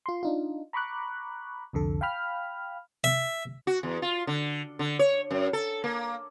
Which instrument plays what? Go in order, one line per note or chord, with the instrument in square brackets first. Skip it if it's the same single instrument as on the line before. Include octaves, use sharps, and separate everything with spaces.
[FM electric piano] F4 C6
D4 D#4 F4
A#5 B5 C#6 D6 F#6
C2 F2 D3 A4
F5 G5 B5 F6
[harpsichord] E5
[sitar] F#4
E2
F4
D3
D3
C#5
F#2
A4
A#3